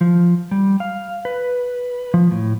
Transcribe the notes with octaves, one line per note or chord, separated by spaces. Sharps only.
F3
G3
F5
B4
F3
A2